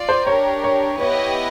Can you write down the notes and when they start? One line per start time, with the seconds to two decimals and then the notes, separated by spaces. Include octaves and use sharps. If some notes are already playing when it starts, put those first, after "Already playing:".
Already playing: F4 D5
0.09 C5
0.27 D4 G4 A#4 C#5
0.64 C#5
1.00 B3 E4 G4 B4 C#5 D#5